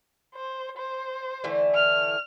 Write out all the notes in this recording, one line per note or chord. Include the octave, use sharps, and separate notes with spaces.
C5
C5
D3 E3 A3
F6